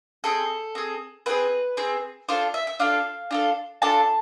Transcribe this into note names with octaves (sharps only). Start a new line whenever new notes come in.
C4 G#4 A4
C4 G#4
C4 G#4 B4
C4 G#4
D4 F4 A4 C5
E5
E5
D4 F4 A4 F5
D4 F4 A4
D4 F4 A4 A5